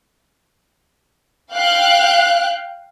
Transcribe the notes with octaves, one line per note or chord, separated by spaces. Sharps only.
F5 G5 F#6